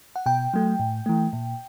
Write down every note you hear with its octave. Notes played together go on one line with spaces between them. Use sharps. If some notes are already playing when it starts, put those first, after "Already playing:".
F#5
B2 G5
F#3 A3
A2
E3 A3
A#2